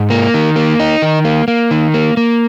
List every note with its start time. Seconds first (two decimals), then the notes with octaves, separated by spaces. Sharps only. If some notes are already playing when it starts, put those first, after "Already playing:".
Already playing: G#2
0.10 A#3
0.34 D#3
0.56 A#3
0.79 D#4
1.02 D#3
1.25 A#3
1.48 A#3
1.71 D#3
1.94 A#3
2.17 A#3